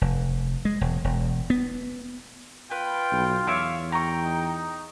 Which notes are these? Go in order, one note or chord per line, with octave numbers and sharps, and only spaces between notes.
F1
G#3
E1
E1
B3
F4 B4 G5
B1
E2 C#5 E5 F5 D6
G5 A#5 C#6
D#4